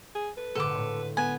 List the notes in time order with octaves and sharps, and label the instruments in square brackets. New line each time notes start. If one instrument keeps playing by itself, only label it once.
[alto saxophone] G#4
[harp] A4 [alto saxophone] B4
[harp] A#1 G#2 D3 [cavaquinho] A4 D6
[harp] A2
[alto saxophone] B3 [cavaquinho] G#5